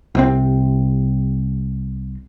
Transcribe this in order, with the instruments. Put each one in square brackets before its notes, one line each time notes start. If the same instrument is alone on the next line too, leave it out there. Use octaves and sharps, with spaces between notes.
[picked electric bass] C2 C3 C4